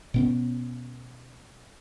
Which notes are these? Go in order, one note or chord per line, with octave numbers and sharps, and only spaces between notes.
B2 B3 C#4